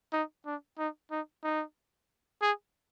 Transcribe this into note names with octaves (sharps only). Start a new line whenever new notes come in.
D#4
D4
D#4
D#4
D#4
G#4